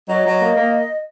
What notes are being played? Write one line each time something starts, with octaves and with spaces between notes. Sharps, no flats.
F#3 D#5
F#3
A#3
A#3